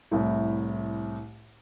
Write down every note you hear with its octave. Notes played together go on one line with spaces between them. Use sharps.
C2 A2